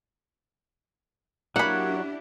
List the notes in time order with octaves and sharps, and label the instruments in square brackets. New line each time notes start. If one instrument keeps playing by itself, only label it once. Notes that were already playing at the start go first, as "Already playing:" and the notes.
[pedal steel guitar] F#3 C#5 [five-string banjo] A#3 B5 [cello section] D4 E4 G4 [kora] F#5